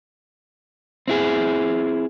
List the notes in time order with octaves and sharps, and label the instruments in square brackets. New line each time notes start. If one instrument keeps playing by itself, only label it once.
[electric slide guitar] C4 E4 G#4